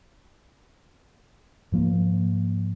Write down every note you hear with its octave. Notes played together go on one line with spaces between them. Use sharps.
G#2 F3 A#3